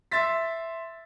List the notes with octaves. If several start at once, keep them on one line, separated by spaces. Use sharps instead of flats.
E5 C6 A6 B6